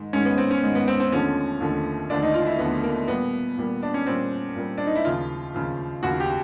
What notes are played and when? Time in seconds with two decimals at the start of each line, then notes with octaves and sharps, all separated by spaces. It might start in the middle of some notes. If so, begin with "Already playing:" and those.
Already playing: G#2 D#3 G#3
0.13 G#2 D#3 G#3 C#4
0.25 B3
0.38 C4
0.51 C#4
0.63 G#2 D#3 G#3
0.75 B3
0.88 C4
1.00 C4
1.11 D#2 D3 F3 A3 C#4
1.61 D#2 D3 F3 A3
2.10 D#2 D3 F3 A3 D4
2.23 D#4
2.34 F4
2.46 E4
2.59 D#2 D3 F3 A3 B3
2.84 A#3
3.08 A#2 G3 A#3 B3
3.57 A#2 G3 A#3
3.83 D4
3.94 C#4
4.06 A#2 G3 A#3 C4
4.56 A#2 G3 A#3
4.78 D4
4.86 D#4
4.96 E4
5.05 D#2 C#3 F3 F4
5.54 D#2 C#3 F3
6.03 D#2 C#3 F3 F#4
6.20 G4